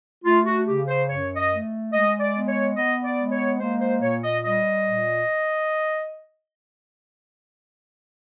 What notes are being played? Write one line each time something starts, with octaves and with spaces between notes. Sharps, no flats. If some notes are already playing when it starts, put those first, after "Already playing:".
A3 F4
F#4
C#3 G4
C5
F#2 C#5
D#5
A3
G#3 D#5
D5
B3
C#5
B3 D#5
D5
G#3
C#5
A#3 C5
C5
A#2 C#5
D#5
G3 D#5
A#2